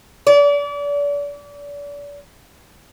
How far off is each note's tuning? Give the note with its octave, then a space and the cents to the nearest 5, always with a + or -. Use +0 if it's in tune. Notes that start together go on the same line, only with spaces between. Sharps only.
D5 -35